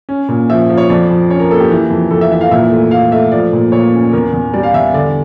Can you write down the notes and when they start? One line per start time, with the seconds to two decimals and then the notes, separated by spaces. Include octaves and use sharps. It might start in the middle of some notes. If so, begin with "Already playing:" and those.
0.09 C#4
0.29 A#2
0.50 F3 E5
0.69 F3
0.77 C#5
0.89 F2 D5
1.10 F2
1.30 C#4 C#5
1.40 A#4
1.50 A#3 A4
1.60 G4
1.70 E3
1.90 F2
2.11 F2 A4
2.21 E5
2.32 E3 E5
2.41 F5
2.51 A#2 E5
2.71 A3
2.91 A3 F5
3.11 A3 E5
3.32 F3 D5
3.53 A#2
3.72 A#2 C#5
3.92 C#4
4.12 E2 A#4
4.33 E2
4.53 G3 D5
4.63 F5
4.74 E2 E5
4.94 D3 D5